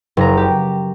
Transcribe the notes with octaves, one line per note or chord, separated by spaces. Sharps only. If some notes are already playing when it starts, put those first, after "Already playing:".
F#1 A#5
G4